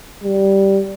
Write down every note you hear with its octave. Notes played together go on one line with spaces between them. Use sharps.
G3